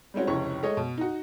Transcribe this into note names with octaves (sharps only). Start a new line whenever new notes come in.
G3 G#3 C4 C#4 F#4
F1 C#2 E4 C#5 C#6
G#3 A3 C#5 D#5
B2
D#4 F#4